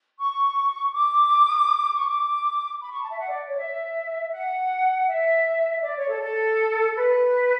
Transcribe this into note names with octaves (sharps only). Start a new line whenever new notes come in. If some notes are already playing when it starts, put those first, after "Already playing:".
C#6
D6
C#6
D6
B5
C#6
A5
E5
F#5
D5
C#5
E5
F#5
E5
D5
C#5
A4
A4
B4